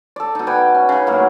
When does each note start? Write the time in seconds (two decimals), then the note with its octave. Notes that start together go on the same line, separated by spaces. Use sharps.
0.16 A4 D5
0.35 B2 D#4
0.47 B4 D5 G5 G#5
0.75 C#4
0.89 C#3 D#4
1.07 A2 F#3 A#3